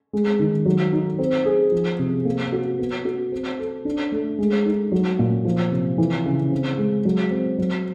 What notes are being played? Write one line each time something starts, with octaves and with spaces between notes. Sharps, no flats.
G#3
D#3
F#3
D#4
C4
G#4
F3
C3
A#3
F#4
B3
F#4
C4
A4
D4
A3
G#3
D#4
F#3
A#2
F3
C3
E3
C#3
C4
G#3
F#3
C4
F#3